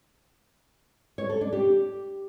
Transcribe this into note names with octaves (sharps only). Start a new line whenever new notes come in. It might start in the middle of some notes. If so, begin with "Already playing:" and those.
C#5
A4
D4
G4